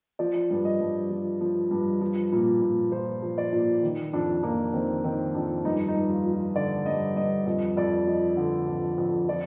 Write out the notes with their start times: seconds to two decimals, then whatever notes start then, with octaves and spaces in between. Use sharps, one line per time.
0.19 F3 D5
0.51 G2
0.65 D#5
0.81 G2
1.10 F3
1.41 F3
1.71 G2
2.02 F3
2.32 A#2
2.62 A#2
2.92 F3 C5
3.22 F3
3.38 D5
3.53 A#2
3.83 D#3
4.13 F2 D4
4.43 F2 A#3
4.73 D#3 C4
5.04 D#3 C4
5.34 F2 D4
5.65 G2 D#4
5.88 D#4
5.95 G2
6.10 F4
6.25 F3
6.33 F4
6.55 D3 D5
6.86 G2 D#5
7.16 G2 D#5
7.46 F2 D#5
7.77 F2 D5
8.07 F3 D#5
8.37 D3
8.68 F2
8.98 F2
9.29 F3 D5